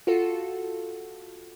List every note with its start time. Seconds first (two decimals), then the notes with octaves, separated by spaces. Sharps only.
0.07 F4 F#4 A4